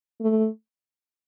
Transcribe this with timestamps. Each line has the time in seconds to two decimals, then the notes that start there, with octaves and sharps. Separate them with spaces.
0.21 A3